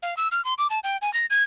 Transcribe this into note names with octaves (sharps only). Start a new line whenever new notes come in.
F5
E6
F6
C6
D6
A5
G5
G#5
A#6
G#6